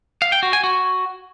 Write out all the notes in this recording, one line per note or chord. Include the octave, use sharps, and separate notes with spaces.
F5
G5
F#4
G#5
F#4